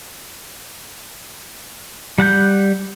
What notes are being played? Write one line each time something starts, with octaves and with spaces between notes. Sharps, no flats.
G3 F#5 A5 G6